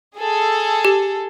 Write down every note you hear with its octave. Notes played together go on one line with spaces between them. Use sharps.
G#4 A4
G4